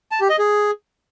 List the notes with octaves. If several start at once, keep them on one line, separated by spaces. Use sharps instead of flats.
A5
G4
D#5
G#4